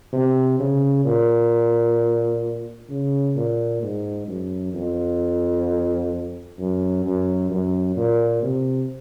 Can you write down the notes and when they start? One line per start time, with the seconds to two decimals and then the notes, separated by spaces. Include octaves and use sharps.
0.13 C3
0.59 C#3
1.05 A#2
2.89 C#3
3.36 A#2
3.82 G#2
4.27 F#2
4.74 F2
6.58 F#2
7.04 F#2
7.51 F#2
7.96 A#2
8.42 C3